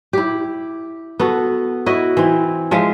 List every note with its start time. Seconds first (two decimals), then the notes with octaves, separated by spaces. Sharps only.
0.13 E4 G4
1.20 B3 F#4 A4
1.86 E4 F#4 D#5
2.17 E3 C4
2.71 F3 G#3 F4 E5